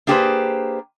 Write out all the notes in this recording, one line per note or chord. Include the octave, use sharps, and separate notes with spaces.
A#3 D4 G4 G#4 B4 C5